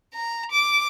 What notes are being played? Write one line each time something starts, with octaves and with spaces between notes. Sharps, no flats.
A#5
D6